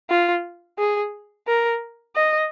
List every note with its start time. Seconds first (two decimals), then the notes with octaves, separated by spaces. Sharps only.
0.10 F4
0.78 G#4
1.47 A#4
2.16 D#5